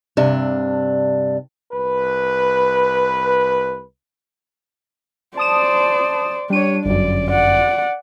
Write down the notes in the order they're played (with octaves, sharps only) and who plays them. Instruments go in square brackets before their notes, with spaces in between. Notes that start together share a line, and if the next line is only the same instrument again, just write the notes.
[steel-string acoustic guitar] G2 C3 D4
[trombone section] C2 B4
[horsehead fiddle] C5 D5 [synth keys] A5 D#6 E7
[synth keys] G3 D#7 [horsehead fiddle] D4 C#5
[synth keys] G1 F#2 [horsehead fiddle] D5
[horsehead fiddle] D5 F#5